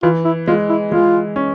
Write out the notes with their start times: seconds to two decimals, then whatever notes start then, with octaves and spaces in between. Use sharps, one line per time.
0.03 E3 F4
0.24 E4
0.47 G#3 F4
0.69 E4
0.92 G#3 F4
1.36 C#4